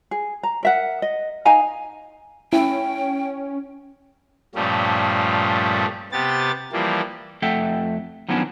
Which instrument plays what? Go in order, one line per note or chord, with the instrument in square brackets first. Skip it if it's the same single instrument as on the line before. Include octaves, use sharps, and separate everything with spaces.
[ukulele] G#4
A#5
A#4 E5 F#5
D#5
D#4 F5 G#5 A#5
[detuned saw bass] C#4 [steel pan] E4 [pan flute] G5
[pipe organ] G2 A#2 F3 G3 A3 C#4
C3 B3 G4 A6
E3 F3 G3 A#3
[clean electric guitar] F2 A3 A4 E5 F#5 G5
D#3 F3 F#3 B3 C#4 D4